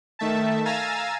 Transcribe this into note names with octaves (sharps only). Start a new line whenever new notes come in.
D#3 A3 E5 A5
F5 G#5 A#5 E6 A6